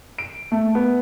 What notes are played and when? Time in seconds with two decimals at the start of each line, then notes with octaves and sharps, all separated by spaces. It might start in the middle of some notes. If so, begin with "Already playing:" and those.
0.18 D7
0.52 A3
0.75 B3